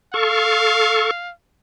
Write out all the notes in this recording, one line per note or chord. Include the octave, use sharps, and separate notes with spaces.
A4 F5 C#6